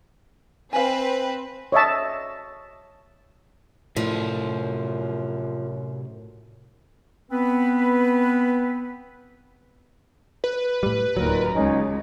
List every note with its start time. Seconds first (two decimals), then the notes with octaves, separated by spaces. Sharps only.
0.73 C4 B4 F5 G#5
1.72 C#5 D#5 E5 A5
3.96 F#2 A2 C3 F3 E4 D5
7.30 B3 C4 B4
10.44 B4
10.83 A2 G3
11.17 D1 D#2 A#2 D#3 F#3 A#4
11.54 C#2 G#3 C#4 D#4